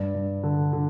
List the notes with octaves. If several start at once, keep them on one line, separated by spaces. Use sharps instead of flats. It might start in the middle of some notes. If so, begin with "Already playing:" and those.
Already playing: G2 D5
G2
D3
D3